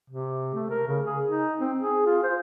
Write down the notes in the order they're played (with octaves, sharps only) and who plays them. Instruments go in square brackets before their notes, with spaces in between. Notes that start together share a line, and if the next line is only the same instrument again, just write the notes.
[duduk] C3
A3
A#4
C#3
G#4
D#4
C4
G#4
F4
C5